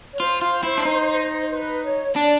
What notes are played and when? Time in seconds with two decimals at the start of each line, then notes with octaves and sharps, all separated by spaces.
0.13 C#5
0.20 F4 C5
0.42 F4
0.64 E4
0.78 D4
0.85 D#4
1.51 B4
1.83 C#5
2.16 D4 D5